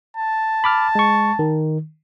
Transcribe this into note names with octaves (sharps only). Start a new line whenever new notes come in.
A5
B5 D6 F6
G#3 C#6
D#3